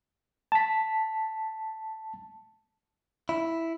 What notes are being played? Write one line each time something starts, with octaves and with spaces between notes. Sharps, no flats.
A5 B6
E4